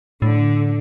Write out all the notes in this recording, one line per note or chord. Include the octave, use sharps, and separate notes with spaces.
A2 D3